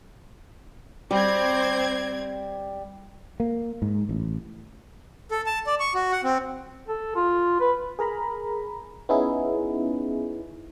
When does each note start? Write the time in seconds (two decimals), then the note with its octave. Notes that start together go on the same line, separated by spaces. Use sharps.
1.11 G3 C4 G#6
3.40 A#3
3.82 G#2
4.09 A1
5.31 A4
5.46 A5
5.66 D5
5.80 C#6
5.94 F#4
6.12 F#5
6.24 C4
6.88 A4
7.15 F4
7.60 B4
7.99 G#4 A#4 A#5 B5
9.09 B3 C#4 D#4 E4 G#4